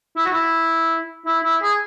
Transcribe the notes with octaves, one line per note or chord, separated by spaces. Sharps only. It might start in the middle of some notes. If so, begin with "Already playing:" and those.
E4
F#4
E4
E4
E4
G#4